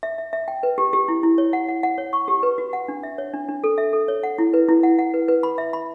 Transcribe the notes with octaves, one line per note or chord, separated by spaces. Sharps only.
E5
E5
E5
G5
B4
G4
G4
E4
E4
C#5
F#5
F#5
F#5
C#5
C#6
G4
B4
F#4
F#5
D4
E5
C#5
D4
D4
A4
E5
A4
C#5
F#5
E4
B4
E4
F#5
F#5
B4
B4
B5
E5
B5